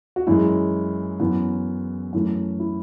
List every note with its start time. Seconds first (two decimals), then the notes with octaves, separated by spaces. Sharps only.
0.16 F#4
0.27 F#2 E3 G#3 E4
1.20 F#2 E3 B3
2.13 F#2 E3 A3
2.60 E4